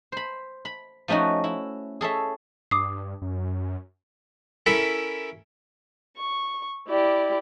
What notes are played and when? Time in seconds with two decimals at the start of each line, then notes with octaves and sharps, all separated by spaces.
0.12 C5 B5
0.65 B5
1.08 F3 A3 C#4 D#4 F#4
1.44 E4
2.01 G#4 A4 C#5 E5
2.71 G2 D6 D#6 C7
3.22 F#2
4.66 C#4 E4 A4 A#4 B5
6.17 C#6
6.87 E4 G4 D5